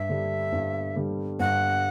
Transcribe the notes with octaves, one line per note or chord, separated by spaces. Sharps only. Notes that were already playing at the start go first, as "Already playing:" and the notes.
Already playing: G2 E5
D3 G3
G2
D3 G3
G2 F#5